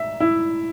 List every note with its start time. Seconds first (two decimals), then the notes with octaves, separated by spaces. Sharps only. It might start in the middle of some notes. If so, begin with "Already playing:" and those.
Already playing: E5
0.20 E4